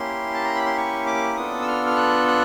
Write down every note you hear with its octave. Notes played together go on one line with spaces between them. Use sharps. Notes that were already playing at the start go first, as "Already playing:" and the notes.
Already playing: A#3 C#4 E4 G4 C6
A5
A#5
B5
C6
C#6
D6
B3 D4 F4 A4 D#6
E6
F6
F6
F#6
F#6